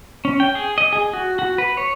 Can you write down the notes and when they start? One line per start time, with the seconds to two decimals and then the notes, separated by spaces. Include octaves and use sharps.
0.25 C#4
0.40 G5
0.55 G#4
0.78 D#5
0.93 G#4
1.13 F#4
1.39 F#4
1.58 B4
1.77 C#5